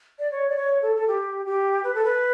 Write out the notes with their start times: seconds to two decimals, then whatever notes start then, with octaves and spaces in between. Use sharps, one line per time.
0.19 D5
0.32 C#5
0.50 D5
0.56 C#5
0.82 A4
0.96 A4
1.08 G4
1.46 G4
1.84 B4
1.95 A4
2.05 B4